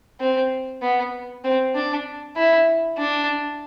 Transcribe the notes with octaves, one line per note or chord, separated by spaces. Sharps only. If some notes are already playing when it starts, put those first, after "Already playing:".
C4
B3
C4
D4
E4
D4